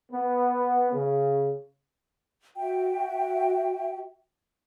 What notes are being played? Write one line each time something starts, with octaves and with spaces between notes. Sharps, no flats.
B3
C#3
F#4 E5 G5